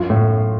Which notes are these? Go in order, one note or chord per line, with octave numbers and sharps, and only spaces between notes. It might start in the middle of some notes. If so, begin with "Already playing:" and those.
Already playing: F#2 F4
A2